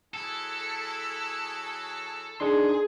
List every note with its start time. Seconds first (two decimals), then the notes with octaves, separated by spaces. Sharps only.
0.14 F#3 E4 G#4 A4
2.40 D4 D#4 G#4 C6